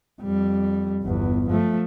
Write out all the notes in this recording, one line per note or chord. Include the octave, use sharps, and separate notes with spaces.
F2 G3
G1 E2
F3 A3